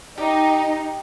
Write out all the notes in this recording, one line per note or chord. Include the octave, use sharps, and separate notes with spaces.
D#4 G4